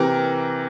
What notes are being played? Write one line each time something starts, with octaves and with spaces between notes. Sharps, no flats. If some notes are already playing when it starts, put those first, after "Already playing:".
Already playing: C3 E3 A#4